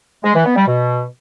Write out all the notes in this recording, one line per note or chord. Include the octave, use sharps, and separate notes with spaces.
G#3
E3
B3
G3
B2